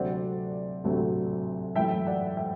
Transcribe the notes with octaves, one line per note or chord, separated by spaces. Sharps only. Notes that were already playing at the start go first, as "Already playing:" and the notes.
Already playing: D2 C3 F#3 A3 C4 D5 F#5
D2 C3 F#3 A3 C4
F#2 E3 A3 E4 E5 G5
D5 F#5
E5 G5